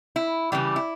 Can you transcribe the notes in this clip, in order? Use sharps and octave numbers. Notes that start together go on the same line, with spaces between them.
E4
C#3 E3 G3 G4
E4